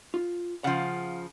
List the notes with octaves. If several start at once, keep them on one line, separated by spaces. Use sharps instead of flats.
F4
C#3 F3 F5 F#5